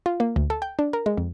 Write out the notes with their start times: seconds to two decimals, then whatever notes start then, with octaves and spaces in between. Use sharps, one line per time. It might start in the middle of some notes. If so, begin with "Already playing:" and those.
0.06 F4
0.20 A#3
0.36 D2
0.50 A4
0.62 G5
0.79 D4
0.93 A#4
1.06 G#3
1.17 F2